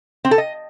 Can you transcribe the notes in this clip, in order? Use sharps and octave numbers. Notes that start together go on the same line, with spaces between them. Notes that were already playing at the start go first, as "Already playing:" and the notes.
C4
A4
D#5